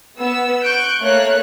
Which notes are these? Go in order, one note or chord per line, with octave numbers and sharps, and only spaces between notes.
B3 E6
C#6 F#6 G6 D7
A3 A#3 C#5 F5 F#6